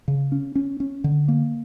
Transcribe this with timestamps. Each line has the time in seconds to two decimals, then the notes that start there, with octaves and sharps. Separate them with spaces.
0.08 C#3
0.32 C#4
0.55 C#4
0.80 C#4
1.04 D3
1.28 A#3